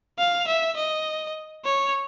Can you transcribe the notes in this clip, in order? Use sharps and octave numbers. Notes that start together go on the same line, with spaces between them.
F5
E5
D#5
C#5